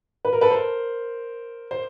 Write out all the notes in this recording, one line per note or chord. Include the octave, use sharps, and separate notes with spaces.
B4
A#4
A4 B4
A#4 C5
C5